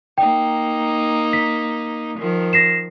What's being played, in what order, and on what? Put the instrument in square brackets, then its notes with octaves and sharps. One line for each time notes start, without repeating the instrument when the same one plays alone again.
[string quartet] A#3 D#4 [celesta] G5
[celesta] B6
[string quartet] D#3 F3
[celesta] A#6 C7 E7